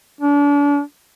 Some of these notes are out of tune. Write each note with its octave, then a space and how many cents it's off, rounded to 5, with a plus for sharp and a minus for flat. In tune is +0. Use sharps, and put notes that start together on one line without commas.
D4 -35